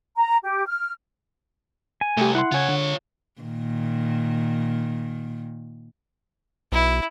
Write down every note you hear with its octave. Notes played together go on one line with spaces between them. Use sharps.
A#5
G4
F6
G#5
C2 A3 G4
E4 F#5 C6
C#3 F4 C#5 G#5 G#6
D3
A#2 D#3
B1 E4